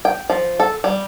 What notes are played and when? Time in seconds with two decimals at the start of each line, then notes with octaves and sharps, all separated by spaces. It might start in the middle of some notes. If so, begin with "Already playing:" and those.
0.05 G5
0.30 F3
0.60 A4
0.84 G3